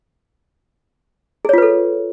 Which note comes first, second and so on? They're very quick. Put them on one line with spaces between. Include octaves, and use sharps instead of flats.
G#4 C#5 F4 B4 A4